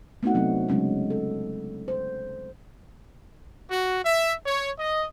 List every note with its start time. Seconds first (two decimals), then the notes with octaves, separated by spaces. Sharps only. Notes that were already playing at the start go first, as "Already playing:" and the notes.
0.23 A3 B3 C4 D#4 F#4 F#5
0.34 C3 F#3 C4 D4
0.69 C#3 F#3 G#3 C#4
1.10 A4
1.88 C5
3.70 F#4
4.04 E5
4.46 C#5
4.78 D#5